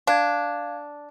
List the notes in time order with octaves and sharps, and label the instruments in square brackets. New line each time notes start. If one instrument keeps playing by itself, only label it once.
[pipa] D4 [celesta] F5 G#6